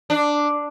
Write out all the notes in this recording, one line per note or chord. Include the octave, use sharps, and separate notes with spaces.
D4